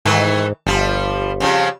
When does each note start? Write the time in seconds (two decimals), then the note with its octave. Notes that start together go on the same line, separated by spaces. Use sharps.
0.05 G#2 D#3 E3 A3
0.67 G1 F3 G3
1.40 F2 C#3 G3